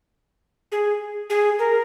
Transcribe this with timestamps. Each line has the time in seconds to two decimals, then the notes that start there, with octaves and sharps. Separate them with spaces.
0.72 G#4
1.30 G#4
1.59 A#4